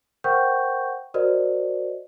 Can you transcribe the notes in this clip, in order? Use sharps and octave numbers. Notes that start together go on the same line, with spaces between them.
A#4 C5 F#5 G5 C#6 G6
F#4 A#4 C5 D5 D#5